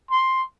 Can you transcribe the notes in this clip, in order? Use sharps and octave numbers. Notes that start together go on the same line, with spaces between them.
C6